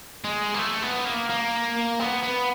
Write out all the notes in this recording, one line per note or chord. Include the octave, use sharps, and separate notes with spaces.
G#3
A#3
A3
B3
A#3
A#3
B3
B3